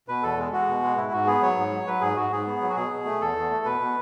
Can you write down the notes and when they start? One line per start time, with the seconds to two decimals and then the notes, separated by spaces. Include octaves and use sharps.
0.08 B2 B4
0.23 E2 A4
0.38 G#3
0.52 G#3 F#4
0.68 B2
0.83 G#3
0.97 G#2 E4
1.12 G#2 F#4
1.27 B3 G#4
1.42 F#3 C#5
1.57 G#2
1.72 F#3
1.87 F#3 B4
2.01 G#2 G#4
2.16 G#2 F#4
2.31 G#2 G#4
2.47 B3
2.61 F#3
2.69 F#4
2.76 B2 G#4
2.91 B2
3.06 A3
3.21 E2 A4
3.36 E2
3.51 A3
3.65 B2 B4
3.80 B2